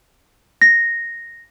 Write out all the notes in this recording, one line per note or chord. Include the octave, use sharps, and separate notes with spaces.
A#6